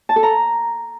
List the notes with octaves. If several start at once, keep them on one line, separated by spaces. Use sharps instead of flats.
A5
A4
A#5